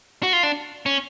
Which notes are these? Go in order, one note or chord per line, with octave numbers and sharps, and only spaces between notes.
F#4
F4
D4
C#4